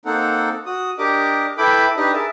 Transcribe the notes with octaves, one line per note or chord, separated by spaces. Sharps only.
A#3 C4 D#4 A4 F#5
F#4 D#6
D4 G4 A#4 D#5 D6
E4 A4 B4 G5 B5 D6
D4 D#4 G4 B4 D#5
G#4 A#4 E5 A5